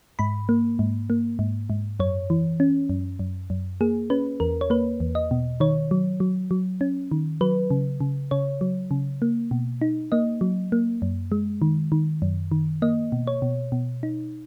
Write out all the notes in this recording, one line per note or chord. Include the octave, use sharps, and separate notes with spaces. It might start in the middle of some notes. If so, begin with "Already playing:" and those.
G#2 B5
A#3
G#2
A#3
G#2
G#2
F#2 C#5
E3
C#4
F#2
F#2
F#2
A#3 G#4
C#4 B4
E2 A#4
C#5
A#3 B4
E2
D#5
B2
D#3 C#5
F#3
F#3
F#3
C#4
D#3
F#3 B4
C#3
C#3
C#3 C#5
F#3
C#3
A#3
B2
D#4
A#3 D#5
F#3
A#3
F#2
G#3
D#3
D#3
F#2
D#3
A#3 D#5
B2
C#5
B2
B2
D#4